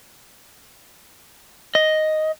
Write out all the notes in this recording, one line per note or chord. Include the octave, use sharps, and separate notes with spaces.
D#5